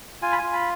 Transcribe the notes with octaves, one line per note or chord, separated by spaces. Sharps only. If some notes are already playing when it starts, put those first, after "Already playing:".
F4 G#5
B5
G#5
F4
B5